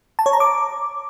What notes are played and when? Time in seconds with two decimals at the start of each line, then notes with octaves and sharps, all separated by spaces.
0.19 A5
0.26 C#5
0.33 A#5
0.40 D6